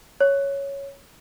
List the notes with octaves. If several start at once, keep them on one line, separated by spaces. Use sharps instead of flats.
C#5